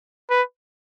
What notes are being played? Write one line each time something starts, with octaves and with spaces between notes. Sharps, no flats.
B4